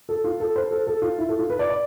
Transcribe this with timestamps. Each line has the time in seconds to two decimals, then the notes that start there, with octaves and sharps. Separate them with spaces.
0.09 A4
0.24 F4
0.40 A4
0.56 C5
0.71 A4
0.87 A4
1.02 F4
1.19 E4
1.29 A4
1.39 F4
1.50 B4
1.59 D5
1.70 D5